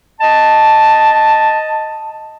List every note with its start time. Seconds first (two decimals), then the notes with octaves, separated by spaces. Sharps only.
0.21 D#5 A5